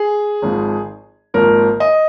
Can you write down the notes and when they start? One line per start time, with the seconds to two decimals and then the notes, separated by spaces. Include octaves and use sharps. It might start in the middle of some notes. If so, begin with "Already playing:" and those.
Already playing: G#4
0.42 G#1 G#2 F3
1.34 G#1 G#2 F3 A#3 A#4
1.80 D#5